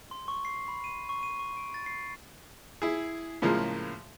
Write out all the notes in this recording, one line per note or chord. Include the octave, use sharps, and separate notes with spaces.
C6
C#6
C7
B5
D#7
C#6
D#7
C#6
D7
A6
C7
E4 G#4
A2 C#3 F3 G#3 A#3